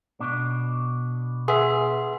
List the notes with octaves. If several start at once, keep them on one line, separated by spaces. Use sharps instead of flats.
B2 D4
G#4 B4 E5 F#5 C6